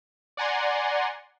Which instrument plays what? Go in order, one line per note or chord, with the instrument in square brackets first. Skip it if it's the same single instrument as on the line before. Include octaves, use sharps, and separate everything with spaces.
[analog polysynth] D5 F#5 G#5 A#5 C6